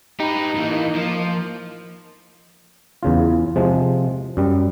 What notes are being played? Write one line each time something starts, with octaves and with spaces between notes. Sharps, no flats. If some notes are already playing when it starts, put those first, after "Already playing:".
D#4 G4 B4
A2 E3 A#3
F3
E2 C#3 F4
C3 F3 G#3
F#2 G3